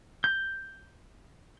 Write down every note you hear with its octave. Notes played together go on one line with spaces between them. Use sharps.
G6